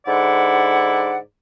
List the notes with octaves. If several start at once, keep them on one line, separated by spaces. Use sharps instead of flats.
G#2 D3 E4 D5 F#5